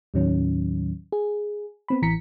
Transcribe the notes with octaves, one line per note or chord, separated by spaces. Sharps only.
D#2 A2 D#3 F#3 C#4
G#4
B3 C4 B5
A1 E3 A#5 B6 C#7